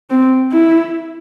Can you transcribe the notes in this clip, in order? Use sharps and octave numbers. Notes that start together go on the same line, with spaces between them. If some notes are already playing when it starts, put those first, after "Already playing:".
C4
E4